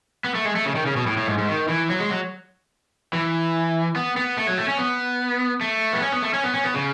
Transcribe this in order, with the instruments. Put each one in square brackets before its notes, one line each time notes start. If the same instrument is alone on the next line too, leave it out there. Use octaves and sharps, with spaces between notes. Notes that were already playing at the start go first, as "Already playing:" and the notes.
[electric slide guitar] B3
A3
G#3
A3
C#3
D#3
C#3
B2
A2
A2
G#2
G#2
D#3
E3
F#3
G#3
F#3
E3
B3
B3
A3
F#3
A3
C#4
B3
A3
B3
C#4
B3
A3
C#4
B3
C#4
B3
C#3